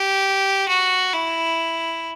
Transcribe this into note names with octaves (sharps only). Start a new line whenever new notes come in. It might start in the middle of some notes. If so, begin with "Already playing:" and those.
Already playing: G4
F#4
E4